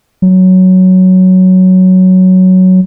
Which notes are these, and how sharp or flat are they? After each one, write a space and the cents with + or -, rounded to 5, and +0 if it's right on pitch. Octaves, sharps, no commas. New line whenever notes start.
F#3 +5